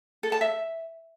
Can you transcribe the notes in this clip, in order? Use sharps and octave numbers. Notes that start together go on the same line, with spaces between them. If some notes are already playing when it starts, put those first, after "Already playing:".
A4
A5
E5